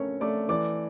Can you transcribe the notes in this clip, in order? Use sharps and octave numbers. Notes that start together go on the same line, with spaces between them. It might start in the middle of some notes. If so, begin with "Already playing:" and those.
Already playing: A3 C#4 D4 A#4 C#5 C#6
A3 D5 D6
E3 D5 D6